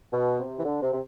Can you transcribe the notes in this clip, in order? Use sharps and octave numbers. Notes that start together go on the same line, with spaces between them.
B2
C3
E3
D3
C3
C3